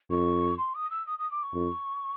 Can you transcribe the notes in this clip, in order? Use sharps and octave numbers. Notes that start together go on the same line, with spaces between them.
F2 C#6
C6
D#6
E6
D#6
D#6
D6
C#6
F2